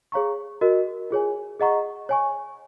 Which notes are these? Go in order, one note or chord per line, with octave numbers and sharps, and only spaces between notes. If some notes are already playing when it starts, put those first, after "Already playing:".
G#4 C#5 F5 A#5 C#6
F#4 A#4 D#5
F4 G#4 C#5 G#5
G#4 D#5 F#5 A#5 C#6
C#5 G#5 C#6